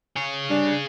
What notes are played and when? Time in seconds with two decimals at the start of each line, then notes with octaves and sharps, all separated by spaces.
0.16 G#4 C#5
0.50 G2 D4